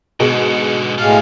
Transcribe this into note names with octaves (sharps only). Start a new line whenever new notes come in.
G#2 B2 D3 G#4
A2 G#3 G4 F5 A5